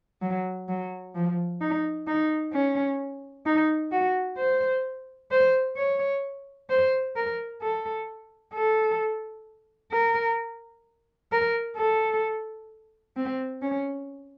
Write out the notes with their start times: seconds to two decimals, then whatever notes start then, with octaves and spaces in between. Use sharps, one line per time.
0.22 F#3
0.69 F#3
1.15 F3
1.61 D#4
2.07 D#4
2.53 C#4
3.46 D#4
3.92 F#4
4.38 C5
5.31 C5
5.77 C#5
6.70 C5
7.16 A#4
7.62 A4
8.54 A4
9.92 A#4
11.32 A#4
11.77 A4
13.17 C4
13.62 C#4